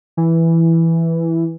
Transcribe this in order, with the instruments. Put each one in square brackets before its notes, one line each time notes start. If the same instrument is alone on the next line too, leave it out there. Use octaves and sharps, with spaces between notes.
[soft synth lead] E3